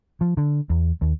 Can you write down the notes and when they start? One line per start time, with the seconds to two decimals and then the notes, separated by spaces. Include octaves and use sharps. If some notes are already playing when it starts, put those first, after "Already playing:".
0.21 F3
0.37 D3
0.70 E2
1.02 D#2